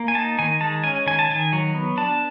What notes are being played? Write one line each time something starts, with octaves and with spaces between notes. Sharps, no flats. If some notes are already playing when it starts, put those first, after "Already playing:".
Already playing: A#3
G#5
D#4 A5
D#3 G#5
G#3 A5
C#4 G#5
D#3 G#5
A5
D#3 G#5
F#3
B3
D4 A5